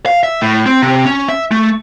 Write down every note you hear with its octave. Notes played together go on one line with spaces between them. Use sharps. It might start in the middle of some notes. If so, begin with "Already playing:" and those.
F5
E5
A2
C4
C3
C#4
E5
A3